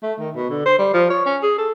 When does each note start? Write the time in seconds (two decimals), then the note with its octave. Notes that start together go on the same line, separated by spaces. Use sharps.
0.03 A3
0.19 D#3
0.36 B2
0.50 D3
0.65 C5
0.78 G3
0.94 F3
1.10 C#5
1.26 C#4
1.42 G#4
1.58 A4